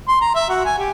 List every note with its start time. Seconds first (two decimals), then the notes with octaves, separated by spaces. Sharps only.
0.08 C6
0.21 A#5
0.35 E5
0.49 F#4
0.65 G#5
0.79 G4